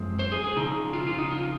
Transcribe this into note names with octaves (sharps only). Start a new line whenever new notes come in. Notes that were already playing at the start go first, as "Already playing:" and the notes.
Already playing: F#2 F3 G#3 C4
C5
G#4
G#4
C#3 F3 C4 D#4
F4
F4
D#4
F4